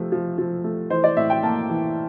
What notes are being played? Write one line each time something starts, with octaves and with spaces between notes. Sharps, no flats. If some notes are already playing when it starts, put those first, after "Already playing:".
Already playing: C3 F3 A3
F3
F3
A3
E3 C5
D5
A2 E5
G5
A#3 A5
E3